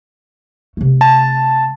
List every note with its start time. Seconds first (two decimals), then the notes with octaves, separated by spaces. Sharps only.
0.77 C3 A3
1.01 A5